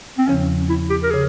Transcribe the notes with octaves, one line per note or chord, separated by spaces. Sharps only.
C4
E2 C#3 F3 C#4
E4
G4
A#4
C#3 G#4